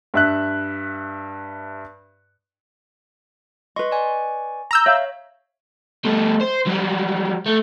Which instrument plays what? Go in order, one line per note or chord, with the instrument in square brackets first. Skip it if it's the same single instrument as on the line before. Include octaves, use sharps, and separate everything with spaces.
[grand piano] G2 E5 F#6
[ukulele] B4 D#5 [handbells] C6 C#6
[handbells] D5 G#5 C#6
[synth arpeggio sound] A#5 E6 G6
[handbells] C#5 [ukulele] E5 F5
[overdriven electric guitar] G3 A3
C5
F#3 G3
A3